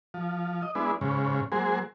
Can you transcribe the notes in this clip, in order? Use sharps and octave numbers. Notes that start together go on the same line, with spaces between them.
F3
D#5
G#3 B3 D4 E4
G#2 C#3
F#3 G#3 A#3 G#4 C5